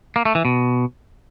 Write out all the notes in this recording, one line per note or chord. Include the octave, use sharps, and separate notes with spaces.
A#3
A3
E3
B2